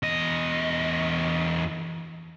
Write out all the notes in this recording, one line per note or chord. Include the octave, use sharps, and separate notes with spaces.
E2 D#5